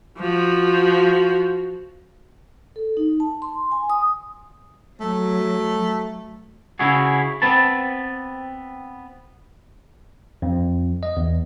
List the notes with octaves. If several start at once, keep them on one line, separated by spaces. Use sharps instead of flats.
F3 F#4
A4
D#4
A5
C6
G#5
D#6
F#3 A3
C#3 E4 F#4 G#4
B3 C4 B4 A5
F2
D#5
E2